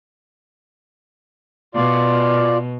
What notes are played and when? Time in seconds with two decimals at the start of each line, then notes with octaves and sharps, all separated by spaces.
1.75 B2 F4 D5